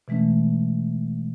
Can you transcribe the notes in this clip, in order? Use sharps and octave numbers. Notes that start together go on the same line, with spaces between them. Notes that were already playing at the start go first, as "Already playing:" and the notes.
B2 E3 G#3 A3 C#4